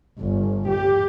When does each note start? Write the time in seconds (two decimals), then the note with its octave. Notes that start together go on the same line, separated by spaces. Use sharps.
0.22 G1
0.70 G4